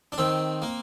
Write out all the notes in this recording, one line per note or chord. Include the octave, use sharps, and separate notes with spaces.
D4
D#3 C4
A#3